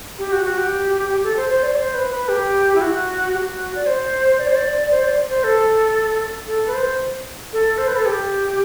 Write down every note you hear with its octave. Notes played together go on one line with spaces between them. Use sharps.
G4
F#4
F#4
G4
A4
C5
C5
D5
C5
B4
B4
G4
E4
F#4
G4
F#4
D5
C5
D5
C5
D5
C5
D5
C5
A4
A4
B4
C5
A4
C5
B4
A4
G4